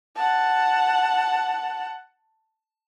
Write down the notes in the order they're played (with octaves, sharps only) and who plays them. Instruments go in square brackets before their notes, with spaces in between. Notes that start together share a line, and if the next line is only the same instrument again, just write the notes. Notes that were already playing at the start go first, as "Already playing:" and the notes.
[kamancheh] F#5 A5